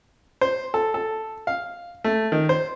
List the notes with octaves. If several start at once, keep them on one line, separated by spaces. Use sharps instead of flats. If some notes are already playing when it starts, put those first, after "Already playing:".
C5
A4
A4
F5
A3
D#3
C5